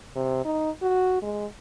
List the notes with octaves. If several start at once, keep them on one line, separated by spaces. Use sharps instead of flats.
C3
D#4
F#4
G#3